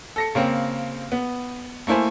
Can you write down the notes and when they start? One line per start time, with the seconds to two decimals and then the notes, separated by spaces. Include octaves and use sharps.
0.16 A4 A#6 C#7
0.35 C#3 A#3 C4
1.12 B3
1.87 A3 A#3 E4 C5 G#5